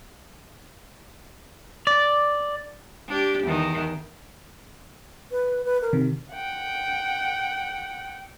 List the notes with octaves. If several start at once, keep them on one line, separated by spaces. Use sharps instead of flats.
D5
D4 G4
E2 D#3
B4
B4
A#4
C3 D#3
F#5 G5